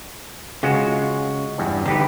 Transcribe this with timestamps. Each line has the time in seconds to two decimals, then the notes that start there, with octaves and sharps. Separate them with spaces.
0.63 C#3 G#3 F4 F#4
1.58 E2 G2
1.86 D3 D#4 G4 B4